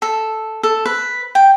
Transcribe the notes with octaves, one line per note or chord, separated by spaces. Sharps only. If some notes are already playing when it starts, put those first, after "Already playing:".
A4
A4
B4
G5